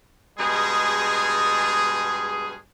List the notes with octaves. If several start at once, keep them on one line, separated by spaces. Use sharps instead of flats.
G2 B2 G#3 G#4